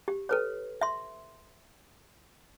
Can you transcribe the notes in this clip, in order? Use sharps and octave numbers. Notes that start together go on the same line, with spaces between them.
G4
A4 B4 C#5
E5 C6